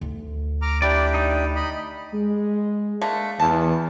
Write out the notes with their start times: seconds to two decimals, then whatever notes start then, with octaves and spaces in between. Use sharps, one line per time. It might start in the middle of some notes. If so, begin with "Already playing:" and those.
0.01 D2
0.62 A#5 D6 F6
0.82 D4 E4 G4 D5
1.14 D#4
1.56 D#5 B5
2.14 G#3
3.01 D3 A3 A#3
3.40 E2 A5